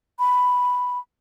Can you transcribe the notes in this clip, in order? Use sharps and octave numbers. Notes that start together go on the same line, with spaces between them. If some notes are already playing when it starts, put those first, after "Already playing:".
B5